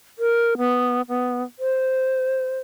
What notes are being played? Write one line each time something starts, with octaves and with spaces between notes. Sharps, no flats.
A#4
B3
B3
C5